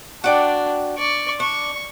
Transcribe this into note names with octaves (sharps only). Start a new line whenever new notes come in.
D4 F#4 D5 G5
D5 C#6
D4 C#6